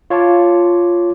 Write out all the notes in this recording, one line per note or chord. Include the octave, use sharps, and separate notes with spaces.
F4 C#5 F5 A5 D6